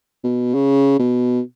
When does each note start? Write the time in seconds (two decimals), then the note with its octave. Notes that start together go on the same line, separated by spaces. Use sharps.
0.24 B2
0.54 C#3
0.99 B2